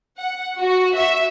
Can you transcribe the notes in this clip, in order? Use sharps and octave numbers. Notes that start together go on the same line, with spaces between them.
F#5
F#4
E5